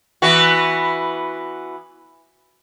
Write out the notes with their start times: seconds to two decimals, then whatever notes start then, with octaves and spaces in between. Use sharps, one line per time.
0.22 E3 B3 F#4